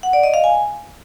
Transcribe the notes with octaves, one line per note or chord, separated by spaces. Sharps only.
F#5
D5
D#5
F5
G#5